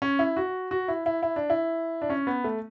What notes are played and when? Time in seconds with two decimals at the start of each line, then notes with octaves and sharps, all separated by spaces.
0.02 C#4
0.19 E4
0.37 F#4
0.71 F#4
0.88 E4
1.06 E4
1.23 E4
1.36 D4
1.50 E4
2.02 D4
2.10 C#4
2.27 B3
2.44 A3